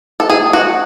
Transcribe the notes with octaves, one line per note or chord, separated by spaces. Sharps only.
A4
G#4
F#4